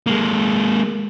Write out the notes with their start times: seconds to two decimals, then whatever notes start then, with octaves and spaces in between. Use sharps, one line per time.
0.07 G#3 A#3